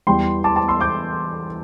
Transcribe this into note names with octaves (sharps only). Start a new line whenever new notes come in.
E2 E3 G3 G5 C6
A5 D6
A5 D6
C6 E6
D6 G6